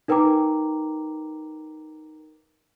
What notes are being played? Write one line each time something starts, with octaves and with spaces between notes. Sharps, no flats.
D#4 A#4 B4 G5 A#5 D6